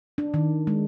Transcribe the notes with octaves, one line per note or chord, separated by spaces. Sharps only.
D4
D#3
G#3